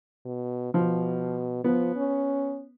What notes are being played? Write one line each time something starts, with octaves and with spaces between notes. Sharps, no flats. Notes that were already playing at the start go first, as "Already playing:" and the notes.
B2
B2 F3
F3 B3
C#4